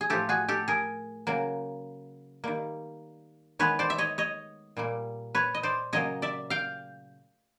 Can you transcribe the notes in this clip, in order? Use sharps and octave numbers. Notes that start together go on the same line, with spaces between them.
G#4
A2 F3 A3 G4 A4
F#4 G#4
G4 A4
G#4 A#4
C#3 F#3 A#3
D#3 G3 A#3
D#3 G#3 B3 B4 C#5
C5 D5
E5
C#5 D#5
C#5 D#5
A#2 G3 A#3
B4 C#5
D#5
C5 D5
C#3 F#3 A#3 C#5 D#5
D5 E5
F5 G5